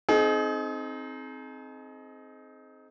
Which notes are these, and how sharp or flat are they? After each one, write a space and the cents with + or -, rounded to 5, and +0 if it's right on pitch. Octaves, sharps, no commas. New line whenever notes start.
C4 +0 D#4 +0 G#4 +40